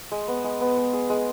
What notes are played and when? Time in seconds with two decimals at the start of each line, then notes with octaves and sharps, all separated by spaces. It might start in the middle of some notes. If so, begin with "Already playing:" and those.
0.11 G#3
0.28 B3
0.44 G#3
0.61 B3
0.77 G#3
0.93 G#4
1.10 G#3